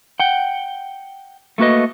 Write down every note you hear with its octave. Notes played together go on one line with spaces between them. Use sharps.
F#5 G5
A3 A#3 F#4 B4 D#5